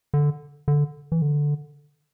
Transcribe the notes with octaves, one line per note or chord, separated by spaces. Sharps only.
D3
D3
E3
D3